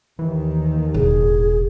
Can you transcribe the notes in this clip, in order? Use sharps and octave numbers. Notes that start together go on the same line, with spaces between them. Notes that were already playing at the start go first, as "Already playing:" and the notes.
D#2 D#3 E3
E1 A2 G#4